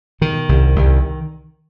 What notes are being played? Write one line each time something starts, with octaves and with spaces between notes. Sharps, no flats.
B2 D#3
C2
C2